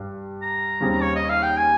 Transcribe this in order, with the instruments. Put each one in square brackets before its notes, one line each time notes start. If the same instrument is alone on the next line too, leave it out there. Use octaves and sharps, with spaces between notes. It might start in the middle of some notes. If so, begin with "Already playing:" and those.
Already playing: [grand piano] G2 G3
[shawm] A#5
[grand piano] D#2 C#3 G3 C4
[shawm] C#5
D#5
F5
G5
G#5